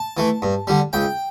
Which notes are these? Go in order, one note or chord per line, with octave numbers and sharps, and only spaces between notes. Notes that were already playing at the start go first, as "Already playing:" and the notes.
Already playing: A5
E3 A3
G2
D3 G3
C#2 G5